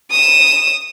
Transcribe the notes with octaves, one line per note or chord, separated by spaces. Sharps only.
D#6 E7